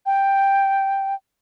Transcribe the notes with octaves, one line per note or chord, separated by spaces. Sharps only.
G5